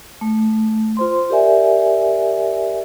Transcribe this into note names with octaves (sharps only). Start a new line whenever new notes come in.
A3
F4 C5 C6
G4 A#4 D5 E5 G#5